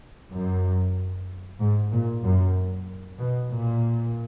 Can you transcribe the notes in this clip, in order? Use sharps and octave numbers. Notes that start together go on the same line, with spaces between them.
F#2
G#2
A#2
F#2
B2
A#2